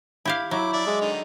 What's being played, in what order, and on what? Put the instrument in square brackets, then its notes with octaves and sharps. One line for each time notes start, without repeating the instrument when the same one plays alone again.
[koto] E4 G4 F5
[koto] F#3 [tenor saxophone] E4 [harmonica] D6
[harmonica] D4 D5 E5
[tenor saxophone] G#3
[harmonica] D3 D#3 D#4